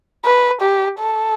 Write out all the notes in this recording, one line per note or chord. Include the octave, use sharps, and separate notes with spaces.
B4
G4
A4